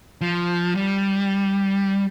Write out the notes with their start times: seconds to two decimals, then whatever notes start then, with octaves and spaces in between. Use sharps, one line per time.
0.21 F3
0.75 G3